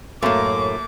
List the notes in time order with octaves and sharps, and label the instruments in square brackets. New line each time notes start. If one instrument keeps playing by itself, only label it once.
[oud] F#2 A2 [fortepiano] A3 A#3 [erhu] D6